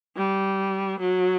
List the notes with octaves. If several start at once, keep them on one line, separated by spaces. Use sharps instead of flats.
G3
F#3